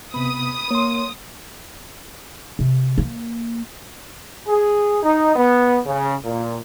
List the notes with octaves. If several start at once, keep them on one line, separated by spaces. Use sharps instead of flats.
C3 B3 B5 D#6
A#3 C#5 C6
C3
A#3
G#4
D#4
B3
C#3
A#2